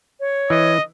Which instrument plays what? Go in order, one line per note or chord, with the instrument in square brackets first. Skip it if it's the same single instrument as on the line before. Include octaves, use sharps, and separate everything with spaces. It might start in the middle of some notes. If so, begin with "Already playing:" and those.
[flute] C#5
[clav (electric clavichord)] E3 [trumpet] D#5